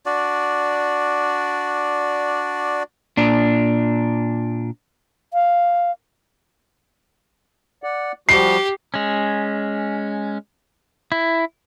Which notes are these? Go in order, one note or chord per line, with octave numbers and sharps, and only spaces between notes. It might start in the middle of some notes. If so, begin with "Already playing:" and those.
D4 F#4 D5
A#2 D4
F5
D5 F#5
F3 G3 F#4 G4 C7
G#3 C#4
E4